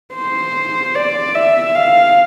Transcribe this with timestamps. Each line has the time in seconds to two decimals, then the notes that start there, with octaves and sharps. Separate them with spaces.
0.15 C5
0.95 D5
1.35 E5
1.75 F5